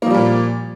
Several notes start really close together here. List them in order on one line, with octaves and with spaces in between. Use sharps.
A#3 F3 G3 A#2